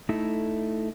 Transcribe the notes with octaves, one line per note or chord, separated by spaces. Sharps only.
A3 D#4 E4 A4